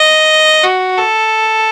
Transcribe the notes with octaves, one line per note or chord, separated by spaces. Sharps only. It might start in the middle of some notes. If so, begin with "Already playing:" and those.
Already playing: D#5
F#4
A4